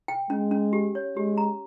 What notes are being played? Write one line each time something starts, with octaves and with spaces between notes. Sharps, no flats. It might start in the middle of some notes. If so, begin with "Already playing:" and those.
G5
G#3 C#4
C#4
G4
C#5
G#3 G4
A#5